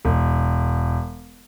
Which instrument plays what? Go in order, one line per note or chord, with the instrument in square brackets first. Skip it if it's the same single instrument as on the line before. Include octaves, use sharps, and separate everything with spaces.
[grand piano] E1